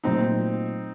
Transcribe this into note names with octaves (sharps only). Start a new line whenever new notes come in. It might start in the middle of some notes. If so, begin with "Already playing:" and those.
A#2 F#3 A3 C4 D#4